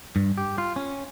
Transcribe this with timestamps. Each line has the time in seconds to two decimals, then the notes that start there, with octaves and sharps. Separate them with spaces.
0.16 G2
0.38 G4
0.58 F4
0.76 C#4